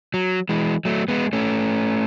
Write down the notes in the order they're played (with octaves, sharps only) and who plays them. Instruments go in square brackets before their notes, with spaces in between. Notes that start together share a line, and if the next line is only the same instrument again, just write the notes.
[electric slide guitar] F#3
E3 G#3
F#3 A3
G#3 B3
A3 C#4